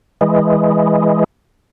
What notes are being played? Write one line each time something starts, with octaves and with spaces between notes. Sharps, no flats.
E3 G#3